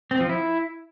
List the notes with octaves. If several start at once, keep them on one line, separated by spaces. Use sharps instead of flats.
C4
F3
E4